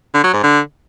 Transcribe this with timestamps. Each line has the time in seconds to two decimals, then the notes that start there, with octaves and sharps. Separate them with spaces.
0.14 D3
0.24 F#3
0.33 G#2
0.43 D3